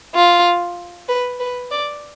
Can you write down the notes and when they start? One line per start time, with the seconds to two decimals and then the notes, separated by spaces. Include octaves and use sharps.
0.15 F4
1.08 B4
1.40 B4
1.71 D5